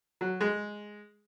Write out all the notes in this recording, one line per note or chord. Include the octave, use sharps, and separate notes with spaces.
F#3
G#3